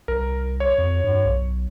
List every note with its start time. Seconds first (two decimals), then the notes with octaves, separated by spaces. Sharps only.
0.08 C2 A#4
0.60 C#5
0.78 F2
1.04 G2
1.25 B1